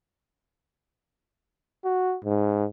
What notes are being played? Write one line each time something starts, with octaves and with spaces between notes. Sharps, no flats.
F#4
G#2